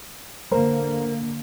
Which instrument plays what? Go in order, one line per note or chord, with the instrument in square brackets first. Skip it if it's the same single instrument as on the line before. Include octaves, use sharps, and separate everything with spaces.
[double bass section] D3 A#3 [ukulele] A#4 C5